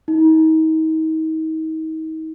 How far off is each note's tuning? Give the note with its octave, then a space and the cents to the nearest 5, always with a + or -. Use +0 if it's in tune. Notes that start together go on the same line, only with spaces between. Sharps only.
D#4 +35